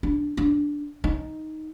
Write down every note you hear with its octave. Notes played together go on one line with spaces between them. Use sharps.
D4
D4
D#4